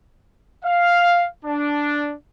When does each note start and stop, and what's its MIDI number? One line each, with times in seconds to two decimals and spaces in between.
0.64 1.25 77
1.45 2.13 62